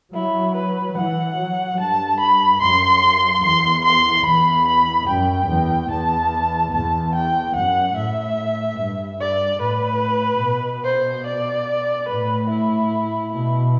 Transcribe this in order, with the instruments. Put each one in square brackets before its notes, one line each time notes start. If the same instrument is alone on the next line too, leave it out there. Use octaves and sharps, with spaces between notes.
[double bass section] F#3 [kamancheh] E4
[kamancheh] B4
[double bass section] E3 [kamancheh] F#5
[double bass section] F#3
[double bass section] G2 [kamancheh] A5
[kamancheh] B5
[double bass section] F#2 [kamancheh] C6
[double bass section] E2 [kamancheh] C6
[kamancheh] C6
[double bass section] E2 [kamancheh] B5
[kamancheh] B5
[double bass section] F#2 [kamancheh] G5
[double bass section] E2
[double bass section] E2 [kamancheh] A5
[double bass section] E2 [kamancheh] A5
[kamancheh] G5
[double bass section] F#2 [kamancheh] F#5
[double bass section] A2 [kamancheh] E5
[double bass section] G2
[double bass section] G2 [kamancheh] D5
[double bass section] A2 [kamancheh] B4
[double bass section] B2
[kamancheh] C5
D5
[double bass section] A2 [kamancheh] B4
[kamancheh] E4
[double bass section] B2 [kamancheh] E4